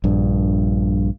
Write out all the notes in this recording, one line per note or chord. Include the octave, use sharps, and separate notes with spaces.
A#1 G2